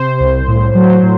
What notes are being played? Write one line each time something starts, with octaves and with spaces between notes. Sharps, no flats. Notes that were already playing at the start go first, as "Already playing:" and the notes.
Already playing: C3 C5
C2
A2
F#3
A2